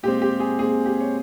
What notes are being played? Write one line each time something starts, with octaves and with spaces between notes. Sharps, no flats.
A#2 G#3 C4 G4
G4
G#4
A#2 G#3 C4 G#4
G4
C#5